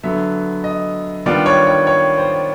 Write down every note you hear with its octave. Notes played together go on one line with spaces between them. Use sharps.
D3 F#3 B3 E5
D#5
D#3 G3 B3 D4 F4 D5
C#5
C#5
C#5
C5